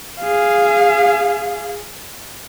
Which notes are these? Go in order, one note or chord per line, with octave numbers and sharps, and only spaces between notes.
G#4 F5